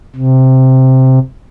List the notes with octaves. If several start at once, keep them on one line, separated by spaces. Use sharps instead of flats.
C3